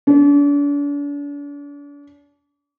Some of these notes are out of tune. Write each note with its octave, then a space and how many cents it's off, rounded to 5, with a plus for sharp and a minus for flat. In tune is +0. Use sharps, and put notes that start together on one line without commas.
D4 -40